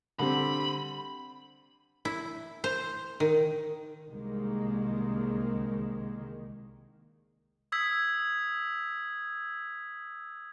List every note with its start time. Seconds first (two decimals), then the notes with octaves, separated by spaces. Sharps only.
0.19 D3 G3 C4 B5
2.05 E4
2.64 C5
3.20 D#3
4.09 C2 D#3 G#3 A#3
7.72 D#6 E6 G#6 B6